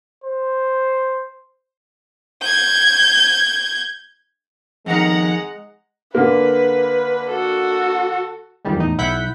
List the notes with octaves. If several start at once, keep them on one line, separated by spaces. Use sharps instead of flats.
C5
G6 G#6
F2 D#3 G#3 F#5 A#5
D3 A#3 B4
F#4 A4
F2 D#3 G3 G#3
E2 A2 D#4
B1 E4 F#5 G6 B6